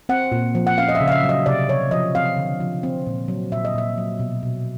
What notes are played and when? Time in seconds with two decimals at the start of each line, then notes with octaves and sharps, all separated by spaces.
0.09 C4 F#5
0.32 A#2
0.55 F3
0.67 F#5
0.78 C#4 F5
0.89 D#5
0.95 E5
1.00 C#3
1.08 F5
1.12 E5
1.23 F#3
1.29 D#5
1.46 C3 D5
1.69 C3 C#5
1.91 F3 D#5
2.15 C4 F5
2.37 D3
2.60 F3
2.83 C4
3.06 A#2
3.28 F#3
3.52 A#2 E5
3.65 D#5
3.74 A#2 E5
3.98 F#3
4.20 B2
4.43 B2